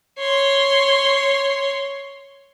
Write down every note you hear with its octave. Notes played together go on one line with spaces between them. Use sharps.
C#5 C6